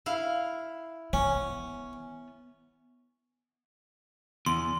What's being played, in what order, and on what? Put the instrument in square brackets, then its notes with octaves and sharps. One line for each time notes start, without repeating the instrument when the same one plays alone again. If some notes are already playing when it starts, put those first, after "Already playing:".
[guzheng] E4 F5
[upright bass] B3 [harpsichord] C#4
[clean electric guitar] E2 [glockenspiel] C6